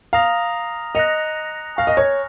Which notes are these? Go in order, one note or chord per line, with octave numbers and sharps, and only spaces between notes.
F5 A#5 D#6 A#6 F7
D#5 F#6 A#6 C#7 F7
F5 G#5 C#6 F6 A#6
D#5
C#5